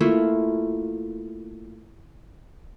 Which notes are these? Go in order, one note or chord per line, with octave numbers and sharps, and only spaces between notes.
A3 A#3 E4 F4